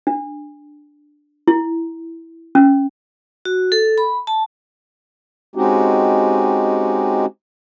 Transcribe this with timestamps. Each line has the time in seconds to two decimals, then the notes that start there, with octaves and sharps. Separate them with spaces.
0.07 D4
1.48 E4
2.55 C#4
3.45 F#4
3.72 A4
3.98 B5
4.27 A5
5.55 G#3 C4 C#4 D#4 F#4 G4